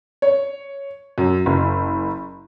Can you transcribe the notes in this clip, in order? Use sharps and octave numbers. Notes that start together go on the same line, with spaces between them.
C#5
F#2
F#1